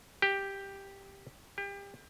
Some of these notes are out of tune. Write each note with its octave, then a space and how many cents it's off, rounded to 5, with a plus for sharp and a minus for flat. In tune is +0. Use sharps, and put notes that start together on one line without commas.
G4 +5
G4 +30